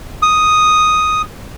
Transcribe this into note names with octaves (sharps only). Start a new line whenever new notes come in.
D#6